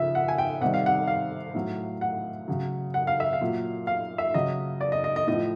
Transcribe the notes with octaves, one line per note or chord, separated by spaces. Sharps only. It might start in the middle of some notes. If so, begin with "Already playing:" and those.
Already playing: C#3 F3 E5
F#5
G#5
G5
C3 D#3 G3 F#5
F5
F#5
F5
A2 F#3
F#5
C#3 F#3
F#5
F5
E5
F5
A#2 F#3
F5
E5
C#3 F#3 D#5
D5
D#5
D#5
D#5
A2 F3 D#5